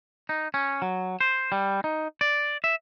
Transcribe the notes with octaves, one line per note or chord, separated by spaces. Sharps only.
D#4
C#4
F#3
C5
G3
D#4
D5
E5